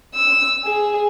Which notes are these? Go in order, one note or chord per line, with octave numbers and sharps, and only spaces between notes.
E6
G#4